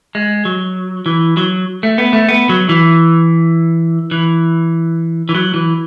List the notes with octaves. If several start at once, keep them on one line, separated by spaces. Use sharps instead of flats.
G#3
F#3
E3
F#3
A3
B3
A3
B3
F#3
E3
E3
E3
F#3
E3